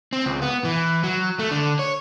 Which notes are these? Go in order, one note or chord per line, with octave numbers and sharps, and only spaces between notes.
C4
C#2
B3
E3
F#3
A3
D3
C#5